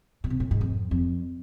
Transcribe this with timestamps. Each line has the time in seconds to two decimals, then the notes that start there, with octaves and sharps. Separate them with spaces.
0.24 B2
0.30 C3
0.40 A2
0.51 G#2
0.61 F2
0.91 F2